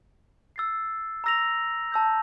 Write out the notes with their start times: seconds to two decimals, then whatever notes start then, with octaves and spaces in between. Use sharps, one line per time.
0.56 E6 A6 C7
1.24 A#5 E6 A#6 F7
1.92 A5 E6 G6